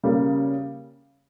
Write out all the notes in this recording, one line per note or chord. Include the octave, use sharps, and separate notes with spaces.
C#3 G3 A#3